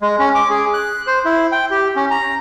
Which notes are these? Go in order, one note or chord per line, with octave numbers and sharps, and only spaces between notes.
G#3
C#4
D6
G#4
F#6
C5
E4
G5
G4
C#4
A#5